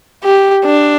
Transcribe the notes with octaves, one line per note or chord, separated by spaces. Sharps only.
G4
D4